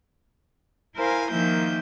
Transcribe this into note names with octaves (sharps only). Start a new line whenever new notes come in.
E4 A#4 C5 F5 G#5
D#3 F3 A#3 E5 G6